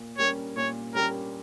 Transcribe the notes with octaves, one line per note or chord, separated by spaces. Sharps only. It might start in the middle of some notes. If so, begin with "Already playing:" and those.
Already playing: A#2
G3 A#3 C#4 G4 C#5
A#2 C#5
G3 A#3 C#4 G4 A#4